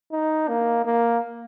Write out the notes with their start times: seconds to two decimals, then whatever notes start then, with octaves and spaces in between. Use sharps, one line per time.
0.12 D#4
0.48 A#3
0.85 A#3